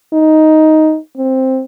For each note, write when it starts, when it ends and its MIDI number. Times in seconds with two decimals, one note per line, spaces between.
0.13 0.97 63
1.17 1.62 60